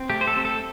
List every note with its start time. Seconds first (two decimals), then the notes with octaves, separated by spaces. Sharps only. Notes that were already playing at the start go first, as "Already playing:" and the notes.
Already playing: C4
0.10 A3 G4
0.21 C5
0.27 A4
0.37 C4
0.45 A4